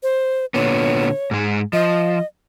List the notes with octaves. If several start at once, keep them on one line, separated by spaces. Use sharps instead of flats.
C5
A#2 D3 B3 C#5
G#2 G#3
F3 D#5